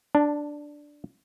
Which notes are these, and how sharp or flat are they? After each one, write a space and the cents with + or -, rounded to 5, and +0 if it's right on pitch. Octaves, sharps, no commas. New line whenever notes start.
D4 +0 A5 +25